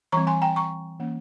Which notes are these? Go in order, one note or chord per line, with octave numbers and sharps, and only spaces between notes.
E3 G3 C4 A#5 C#6
G#5 C6
G5 A#5
A#5 C#6
E3 A#3 C#4